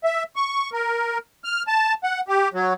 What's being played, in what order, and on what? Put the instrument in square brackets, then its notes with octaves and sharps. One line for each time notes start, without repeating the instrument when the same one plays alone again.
[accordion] E5
C#6
A#4
F6
A5
F#5
G4
F#3